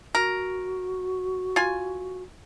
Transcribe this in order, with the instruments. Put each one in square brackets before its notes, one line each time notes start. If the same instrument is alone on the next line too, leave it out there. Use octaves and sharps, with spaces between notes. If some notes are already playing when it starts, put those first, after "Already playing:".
[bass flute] F#4 [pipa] A#4
[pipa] F4 G#5